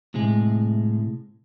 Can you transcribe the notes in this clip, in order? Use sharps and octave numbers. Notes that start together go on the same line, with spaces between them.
A2 C3 G#3 G#4